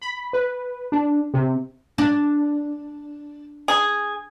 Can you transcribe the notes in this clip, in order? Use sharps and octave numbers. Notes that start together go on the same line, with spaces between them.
B5
B4
D4
C3
D4
G#4